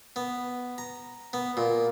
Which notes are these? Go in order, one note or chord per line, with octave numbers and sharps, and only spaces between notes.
B3
A#5
B3
A#2